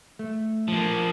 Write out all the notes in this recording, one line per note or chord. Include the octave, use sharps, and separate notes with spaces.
A3
F3 A#3